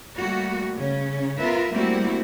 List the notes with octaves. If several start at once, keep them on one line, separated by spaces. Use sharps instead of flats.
G3 A3 A#3 F#4
C#3 C#4
B3 F4 A#4 B4 E5
G3 A3 A#3 C4 E4 F#4